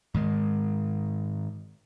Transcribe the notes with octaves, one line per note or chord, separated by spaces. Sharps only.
G#2 D#3 G#3